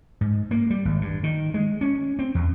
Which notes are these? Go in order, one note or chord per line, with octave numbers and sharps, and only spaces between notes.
G#2
A#3
G3
G#1
G2
D#3
G#3
C#4
C4
E2